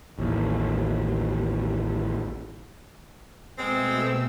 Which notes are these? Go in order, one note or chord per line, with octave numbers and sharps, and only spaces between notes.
A1 D#2
B2 G#3 A3 C4 E6